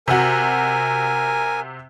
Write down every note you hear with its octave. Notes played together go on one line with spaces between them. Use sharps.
C3 F#4 A#4 G#5